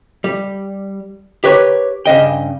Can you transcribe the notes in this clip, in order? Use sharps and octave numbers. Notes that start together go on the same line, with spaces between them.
G3
G4 A#4 B4 C#5
G2 C#3 D#5 G5